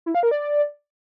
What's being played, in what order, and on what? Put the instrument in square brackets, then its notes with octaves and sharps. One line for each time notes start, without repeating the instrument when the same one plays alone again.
[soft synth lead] E4
F5
A#4
D5